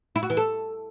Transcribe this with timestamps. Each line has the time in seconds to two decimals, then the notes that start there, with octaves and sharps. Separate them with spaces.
0.16 E4
0.23 F#4
0.30 E3
0.37 A4